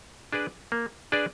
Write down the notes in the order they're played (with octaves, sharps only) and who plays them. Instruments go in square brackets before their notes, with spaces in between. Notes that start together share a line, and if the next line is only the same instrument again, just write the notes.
[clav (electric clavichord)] D4 G#4 B4 D5
A#3
D4 G#4 B4 D5